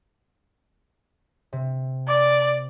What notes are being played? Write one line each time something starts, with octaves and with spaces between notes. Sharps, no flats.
C3
D5 D6